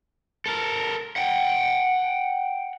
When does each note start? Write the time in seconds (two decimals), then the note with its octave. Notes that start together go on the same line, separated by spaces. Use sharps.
0.46 A4 A#4
1.16 F#5 G5